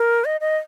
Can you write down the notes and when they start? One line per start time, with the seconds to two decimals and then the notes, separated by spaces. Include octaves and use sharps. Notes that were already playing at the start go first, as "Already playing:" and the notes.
Already playing: A#4
0.25 D#5
0.41 D#5